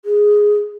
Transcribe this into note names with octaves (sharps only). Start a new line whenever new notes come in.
G#4